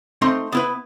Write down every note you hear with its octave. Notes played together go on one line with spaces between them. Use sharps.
A3 C4 D#4 C6
B3 E4 B4